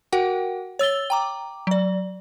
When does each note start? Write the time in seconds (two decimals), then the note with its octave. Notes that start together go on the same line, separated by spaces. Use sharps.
0.12 F#4 A#4 F#5 G5
0.79 C#5 E6 A6 G7
1.10 G5 A#5 D6
1.67 F#3 D5